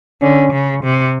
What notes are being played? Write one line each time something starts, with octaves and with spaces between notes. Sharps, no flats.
D3 C#4
C#3
C3